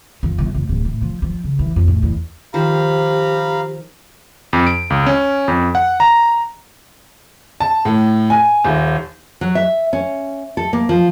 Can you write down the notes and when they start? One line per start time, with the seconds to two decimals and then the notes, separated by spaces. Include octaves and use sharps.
0.23 F2
0.38 G1
0.54 F1
0.69 D1
0.85 A2
1.02 F3
1.22 F3
1.44 C#3
1.59 E3
1.76 F2
1.88 A2
2.03 E2
2.54 D#3 F3 G4 C5 F5 A#5 B5
4.53 F2
4.67 D7
4.90 C#2
5.06 C#4
5.48 F2
5.75 F#5
6.00 A#5
7.60 A5
7.85 A2
8.30 G#5
8.64 D#1
9.41 F#3
9.55 E5
9.93 C#4
10.57 A4
10.73 A#3
10.89 F3